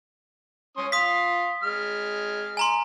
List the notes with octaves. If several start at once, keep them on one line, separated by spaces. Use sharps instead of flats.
C#4 C6 D#6
F5 C6 D#6 B6
G#3 F6
G#5 A#5 C6